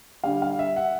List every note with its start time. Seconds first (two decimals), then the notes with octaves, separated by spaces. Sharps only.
0.24 D3 G3 F5
0.42 F5
0.59 E5
0.76 F#5